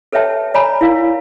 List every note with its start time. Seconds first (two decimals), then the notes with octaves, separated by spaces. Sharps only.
0.12 A4 B4 C#5 E5 G5 A5
0.54 C#5 D5 G#5 A#5 B5
0.81 E4 A#4 F5